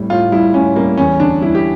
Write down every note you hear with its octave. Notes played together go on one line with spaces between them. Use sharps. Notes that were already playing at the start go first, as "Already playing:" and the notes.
Already playing: A2 G3
A2 F4
G3 E4
A2 C#4
G3 A#3
E2 C#4
D3 D4
G3 E4
G4